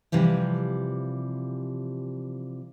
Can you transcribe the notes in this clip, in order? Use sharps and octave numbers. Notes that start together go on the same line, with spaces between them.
C3 E3 F3 G3